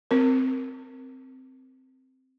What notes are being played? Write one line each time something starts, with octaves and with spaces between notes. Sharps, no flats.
C4 A#4